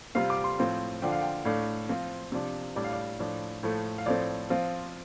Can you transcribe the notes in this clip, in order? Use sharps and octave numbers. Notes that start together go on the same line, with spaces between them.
C3 G3 C4 F4 F5
D6
C6
A2 F3 C4 F4
D3 F3 D4 F4 G5
F5
G5
A2 A3 D4 F5
F3 C4 F4
C3 F3 D4
A2 G3 D4 D5
F5
D5
A2 F3 D4
A2 F3 A3
F5
A2 F3 A3 C4 D5
F3 C4 F4